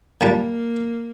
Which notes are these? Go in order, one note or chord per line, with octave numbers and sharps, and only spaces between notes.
A#2 G3 A#3 D4